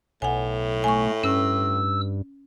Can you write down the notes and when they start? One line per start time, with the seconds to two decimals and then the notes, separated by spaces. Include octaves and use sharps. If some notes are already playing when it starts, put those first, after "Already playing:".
0.22 B1 A2 F#5 G#5
0.84 A3 G#5 C#6
1.24 G2 C#4 E6